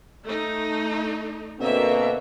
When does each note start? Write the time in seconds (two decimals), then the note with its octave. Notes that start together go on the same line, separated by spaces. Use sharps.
0.25 A3 D#4
1.59 B2 D3 A#3 C4 E5